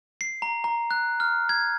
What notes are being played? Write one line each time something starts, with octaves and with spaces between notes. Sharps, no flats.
C7
A#5
A#5
F#6
F6
G#6